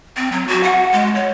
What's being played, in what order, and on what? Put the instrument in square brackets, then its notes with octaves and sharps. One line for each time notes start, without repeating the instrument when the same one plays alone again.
[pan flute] C4
F#3
F#4
F#5
G#3
C#5